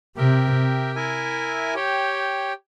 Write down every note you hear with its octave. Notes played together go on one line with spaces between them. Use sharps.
C3 G4 A#4 E5 G5
E4 A#4 E5 G#5
G4 C#5 G5